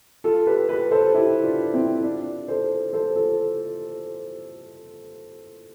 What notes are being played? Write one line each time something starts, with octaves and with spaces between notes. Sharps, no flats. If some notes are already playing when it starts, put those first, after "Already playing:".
F4 A4
G4 B4
G4 B4
A4 C5
E4 G4
D4 F4
C4 E4
D4 F4
A4 C5
A4 C5
F4 A4